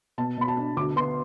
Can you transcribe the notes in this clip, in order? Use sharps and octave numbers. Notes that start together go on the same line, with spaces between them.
B2 A5
B2 B5
A5
D4
D2 D6
B3 C6